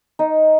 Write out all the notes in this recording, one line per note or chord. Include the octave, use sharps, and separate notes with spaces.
D#4